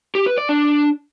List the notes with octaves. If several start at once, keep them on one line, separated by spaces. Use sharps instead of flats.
G4
B4
D5
D4